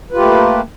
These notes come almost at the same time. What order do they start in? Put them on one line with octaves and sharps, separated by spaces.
B4 F4 G4 A3 A#3